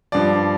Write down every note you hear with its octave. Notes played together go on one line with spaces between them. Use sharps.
G2 F3 D5